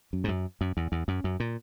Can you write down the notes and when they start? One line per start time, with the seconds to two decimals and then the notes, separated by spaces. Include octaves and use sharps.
0.13 F#2
0.24 G#2
0.28 F#2
0.61 F#2
0.77 E2
0.92 E2
1.08 F#2
1.24 F#2
1.40 A#2